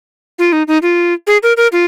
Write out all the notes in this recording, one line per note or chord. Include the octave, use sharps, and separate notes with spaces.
F4
D#4
D#4
F4
G#4
A#4
A#4
F4